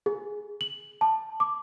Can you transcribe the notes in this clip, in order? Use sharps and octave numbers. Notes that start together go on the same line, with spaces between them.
G#4
F#7
A5
D6